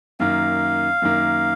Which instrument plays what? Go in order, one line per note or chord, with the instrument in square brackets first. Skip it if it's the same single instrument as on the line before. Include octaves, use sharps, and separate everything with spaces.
[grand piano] F#2 D#3 A#3 [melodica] F5
[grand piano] F#2 D#3 A#3